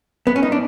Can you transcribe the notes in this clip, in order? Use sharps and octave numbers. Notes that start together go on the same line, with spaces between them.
B3
C#4
D#4
D4